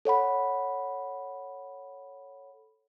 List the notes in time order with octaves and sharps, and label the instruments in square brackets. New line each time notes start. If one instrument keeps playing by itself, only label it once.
[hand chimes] A4 C#5 F#5 B5